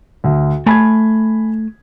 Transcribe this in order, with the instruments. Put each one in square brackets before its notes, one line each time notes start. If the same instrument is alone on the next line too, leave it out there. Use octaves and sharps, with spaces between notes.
[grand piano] D2
[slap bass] A3 [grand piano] G#5 B5 G#6